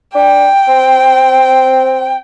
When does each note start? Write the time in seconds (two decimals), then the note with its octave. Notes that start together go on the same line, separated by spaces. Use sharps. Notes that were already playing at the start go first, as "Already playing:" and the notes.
0.15 D4 G5
0.68 C4